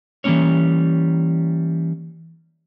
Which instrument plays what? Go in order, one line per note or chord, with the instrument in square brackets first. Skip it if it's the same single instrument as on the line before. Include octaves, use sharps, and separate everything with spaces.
[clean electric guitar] E3 G3 G#3 A#3 C#4 C#5